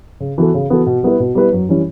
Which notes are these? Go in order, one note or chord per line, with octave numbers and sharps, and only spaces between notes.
C#3
E3 B3 F#4 A4
C#3
E3 B3 F#4 A4
B2
G3 B3 E4 B4
B2
G3 B3 E4 B4
F#2
E3 G3 C#4 E4